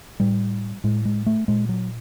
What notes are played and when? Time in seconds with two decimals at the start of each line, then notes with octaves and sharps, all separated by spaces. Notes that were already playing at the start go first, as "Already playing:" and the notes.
0.20 A2 G3
0.84 A2 G#3
1.05 G#3
1.27 A3
1.48 A#2 G#3
1.69 F#3